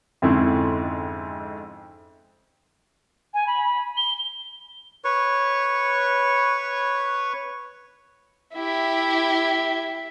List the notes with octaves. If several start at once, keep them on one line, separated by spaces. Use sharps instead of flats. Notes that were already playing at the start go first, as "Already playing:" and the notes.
F2 G#2 D3 C4 C#4 E4
G#5
B5
G7
B4 C#5 C#6
E4 G4 E5